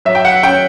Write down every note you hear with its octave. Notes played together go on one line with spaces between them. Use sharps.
F#3 E5
G5
F#5
C#4 G5